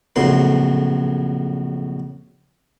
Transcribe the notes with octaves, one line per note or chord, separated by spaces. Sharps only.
A#1 F2 A2 C#3 F#3 C6